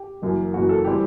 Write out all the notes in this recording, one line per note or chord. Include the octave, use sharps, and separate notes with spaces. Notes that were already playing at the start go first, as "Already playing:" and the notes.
Already playing: G4
F#1 F#2 E3
F#1 F#2 E3 F#4
A4
E3 G3 C4 G4